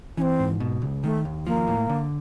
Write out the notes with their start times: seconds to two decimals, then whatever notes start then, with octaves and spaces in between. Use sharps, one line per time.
0.17 E3 C#4
0.22 C4
0.39 G#2
0.60 B2
0.82 C#2
1.04 D#3 A3
1.25 D#2
1.47 F3 A#3
1.68 A2
1.89 D3